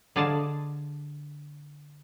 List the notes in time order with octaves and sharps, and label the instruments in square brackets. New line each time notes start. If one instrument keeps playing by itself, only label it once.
[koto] D3 G#4 D5 D#5 F5 A5